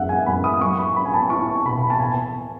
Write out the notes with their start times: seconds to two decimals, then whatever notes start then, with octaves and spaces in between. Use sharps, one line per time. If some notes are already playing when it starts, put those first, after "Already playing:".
Already playing: F#2 G#3 E5 F#5
0.09 G#5
0.26 F#2 B5
0.44 D#6
0.61 F#3 C#6
0.79 B5
0.96 C#4 B5
1.05 G#5
1.14 A5
1.30 E4 C#6
1.56 A5
1.65 B2 B5
1.90 A5
2.00 B2 G#5